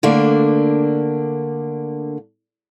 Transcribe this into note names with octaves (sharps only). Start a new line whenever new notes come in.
D3 A3 A#3 D4